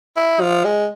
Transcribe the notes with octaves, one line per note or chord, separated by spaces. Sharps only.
E4
F3
G#3